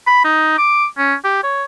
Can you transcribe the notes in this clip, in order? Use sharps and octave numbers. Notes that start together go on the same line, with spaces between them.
B5
D#4
D6
C#4
G4
C#5